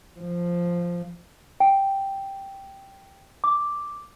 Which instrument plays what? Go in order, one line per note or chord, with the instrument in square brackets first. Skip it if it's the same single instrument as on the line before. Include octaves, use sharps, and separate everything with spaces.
[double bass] F3
[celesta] G5
D6